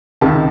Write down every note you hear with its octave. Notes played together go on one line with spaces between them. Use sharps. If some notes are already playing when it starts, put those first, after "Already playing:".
C#2 C3 D#3 A5